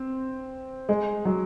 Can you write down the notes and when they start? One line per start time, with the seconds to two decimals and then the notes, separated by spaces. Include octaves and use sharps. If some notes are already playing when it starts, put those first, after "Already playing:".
Already playing: C4
0.89 G#3
1.25 F#3